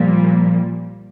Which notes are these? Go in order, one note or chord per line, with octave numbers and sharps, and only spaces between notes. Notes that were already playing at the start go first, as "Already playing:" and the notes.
Already playing: A#2 F3 G3 A#3